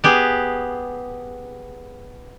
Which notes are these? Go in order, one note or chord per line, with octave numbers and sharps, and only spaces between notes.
B3 G4 G#4